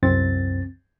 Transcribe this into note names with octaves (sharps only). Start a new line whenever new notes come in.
C2 F#2 C4 A6